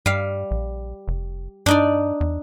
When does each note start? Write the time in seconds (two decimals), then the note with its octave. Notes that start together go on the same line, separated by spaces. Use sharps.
0.06 G2 G3 F5
0.51 A#1
1.08 F1
1.66 G2 D4 D#4 D5
2.21 E2